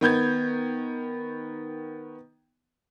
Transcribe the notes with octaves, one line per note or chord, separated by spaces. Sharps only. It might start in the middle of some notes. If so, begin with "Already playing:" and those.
D#3 B3 G6 G#6